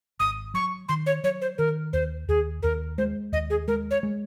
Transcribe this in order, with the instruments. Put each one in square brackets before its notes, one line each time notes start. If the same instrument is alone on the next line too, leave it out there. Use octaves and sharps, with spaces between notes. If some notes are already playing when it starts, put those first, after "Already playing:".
[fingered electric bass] G#1 [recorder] D#6
[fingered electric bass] F#3 [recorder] C#6
[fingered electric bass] D#3 [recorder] C6
[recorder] C#5
[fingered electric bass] F#3 [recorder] C#5
[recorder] C5
[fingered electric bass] D#3 [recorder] A#4
[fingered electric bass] D#2 [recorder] C5
[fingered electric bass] D#2 [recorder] G#4
[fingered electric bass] D#2 [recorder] A#4
[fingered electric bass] G#3 [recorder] C5
[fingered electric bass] D#2 [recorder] D#5
[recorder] G#4
[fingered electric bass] G#3 [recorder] A#4
[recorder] C#5
[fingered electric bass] G#3